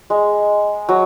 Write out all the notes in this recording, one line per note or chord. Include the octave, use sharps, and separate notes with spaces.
G#3
F#3